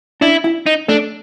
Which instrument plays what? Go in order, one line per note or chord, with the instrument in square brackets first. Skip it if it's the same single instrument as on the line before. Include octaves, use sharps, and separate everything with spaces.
[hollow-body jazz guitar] D4 [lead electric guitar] E4
[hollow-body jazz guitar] E4
[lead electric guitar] D#4
[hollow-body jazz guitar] A3 [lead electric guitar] D4